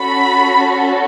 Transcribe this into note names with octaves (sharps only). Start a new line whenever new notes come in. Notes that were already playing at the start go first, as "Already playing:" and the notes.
Already playing: C#4 F#4 A4 B5